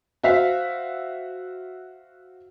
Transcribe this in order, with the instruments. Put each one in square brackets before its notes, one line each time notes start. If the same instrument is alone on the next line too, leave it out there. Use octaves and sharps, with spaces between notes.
[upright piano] F#4 C5 E5 F5